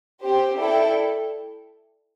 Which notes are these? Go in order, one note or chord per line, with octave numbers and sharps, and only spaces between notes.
C4 G4 C5
E4 A4 D5 G5